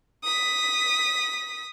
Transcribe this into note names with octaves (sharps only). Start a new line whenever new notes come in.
D#6 B6